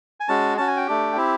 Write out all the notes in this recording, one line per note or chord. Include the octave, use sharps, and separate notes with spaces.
G#5
G#3 C#4 F#4 A5
C#4 F#4 A5
G#5
G5
A3 D4 G4
C4 E4 G4